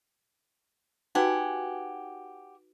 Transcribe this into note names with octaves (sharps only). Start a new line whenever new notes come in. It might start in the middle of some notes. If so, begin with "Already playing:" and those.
D#4 F#4 G4 B4 F#5 G#5